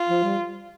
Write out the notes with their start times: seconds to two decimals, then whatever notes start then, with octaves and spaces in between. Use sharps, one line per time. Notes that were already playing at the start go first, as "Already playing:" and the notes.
Already playing: F4
0.08 F3
0.24 G3